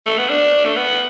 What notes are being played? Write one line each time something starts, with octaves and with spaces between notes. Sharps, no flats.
A3
B3
D4
A3
B3